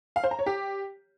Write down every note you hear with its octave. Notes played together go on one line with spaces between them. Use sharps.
F5
C5
A#5
C#5
G4